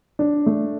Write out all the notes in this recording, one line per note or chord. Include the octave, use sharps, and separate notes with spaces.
D4
A3